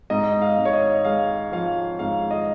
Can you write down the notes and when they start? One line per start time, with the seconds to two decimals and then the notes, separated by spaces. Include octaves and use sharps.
0.10 G#2 D#5
0.41 F5
0.58 G#2
0.65 C#5
0.73 D#5
1.05 G#3 F5
1.52 F3 F5
1.99 G#2 F5
2.31 D#5